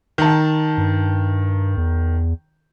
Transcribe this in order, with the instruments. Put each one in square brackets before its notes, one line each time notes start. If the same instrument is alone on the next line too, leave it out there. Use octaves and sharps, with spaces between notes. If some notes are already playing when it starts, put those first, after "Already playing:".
[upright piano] D#3 A5
[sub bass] G2
E2